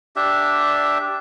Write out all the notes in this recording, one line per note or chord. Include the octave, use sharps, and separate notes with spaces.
D4 G4 E5